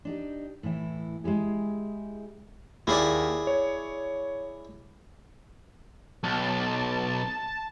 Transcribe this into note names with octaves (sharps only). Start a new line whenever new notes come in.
D4 D#4 G4
A2 E3 E4
G#3 E4 G4 G#4
D#2 E4 G#4 D5
C#5
B1 A5